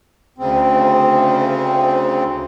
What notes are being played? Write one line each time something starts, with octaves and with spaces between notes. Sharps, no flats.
D2 C#3 C4